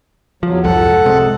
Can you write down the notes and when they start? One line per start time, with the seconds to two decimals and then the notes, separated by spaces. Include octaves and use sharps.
0.43 E2 F3 F#3
0.64 C2 F2 G#2 A4 F#5
1.06 C3 G#3